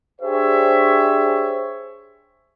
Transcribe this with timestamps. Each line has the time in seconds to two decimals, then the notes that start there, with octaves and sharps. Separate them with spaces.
0.21 D4 G4 G#4 C5 C#5 E5